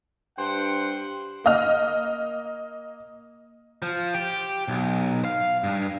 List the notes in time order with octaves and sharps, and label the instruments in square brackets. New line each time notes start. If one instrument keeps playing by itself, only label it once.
[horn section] G2 C5 F#5 G5
[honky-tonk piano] A#3 D#5 F6
[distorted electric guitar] F3
G4
B1
F5
G2